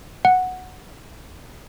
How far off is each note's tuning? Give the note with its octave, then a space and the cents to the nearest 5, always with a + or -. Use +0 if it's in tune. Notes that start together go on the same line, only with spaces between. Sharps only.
F#5 -5